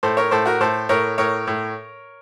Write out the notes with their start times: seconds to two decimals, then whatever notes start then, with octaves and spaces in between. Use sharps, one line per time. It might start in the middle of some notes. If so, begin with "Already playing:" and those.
0.03 A2 A4 C5
0.17 A#4 C#5
0.31 A2 A4 C5
0.46 F#4 A#4
0.60 A2 A4 C5
0.89 A2 A#4 C#5
1.18 A2 A#4 C#5
1.47 A2